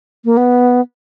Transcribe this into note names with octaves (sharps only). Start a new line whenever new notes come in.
A#3
B3